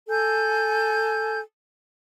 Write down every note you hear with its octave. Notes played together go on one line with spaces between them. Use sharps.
A4 G#5 G6